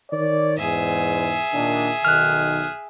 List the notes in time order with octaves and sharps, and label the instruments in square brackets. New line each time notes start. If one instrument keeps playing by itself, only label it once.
[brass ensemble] D#3 C#5 D5
[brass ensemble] E2 G#2 [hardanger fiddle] G#4 E5
[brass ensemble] A#2 D#3 D4
[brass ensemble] B1 D#3 [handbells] F6 F#6